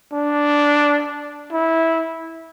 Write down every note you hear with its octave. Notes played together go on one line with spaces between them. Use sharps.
D4
E4